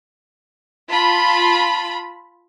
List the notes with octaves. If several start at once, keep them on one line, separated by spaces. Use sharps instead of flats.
F4 A5 B5